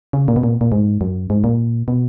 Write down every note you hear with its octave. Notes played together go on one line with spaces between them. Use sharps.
C#3
A#2
B2
A#2
A#2
G#2
F#2
G#2
A#2
B2